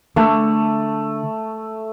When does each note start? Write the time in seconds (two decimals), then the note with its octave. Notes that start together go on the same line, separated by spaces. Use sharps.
0.16 D3 A3